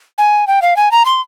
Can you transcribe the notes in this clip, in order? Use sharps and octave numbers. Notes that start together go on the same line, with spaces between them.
G#5
G5
F5
G#5
A#5
C6